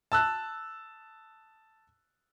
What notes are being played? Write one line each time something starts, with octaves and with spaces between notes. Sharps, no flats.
A5 E6 F#6